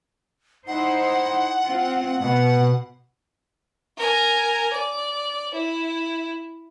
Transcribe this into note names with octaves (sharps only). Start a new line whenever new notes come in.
D#4 E4 C5 F#5
C4 F4
B2 F#5
A#4 G#5
D5
E4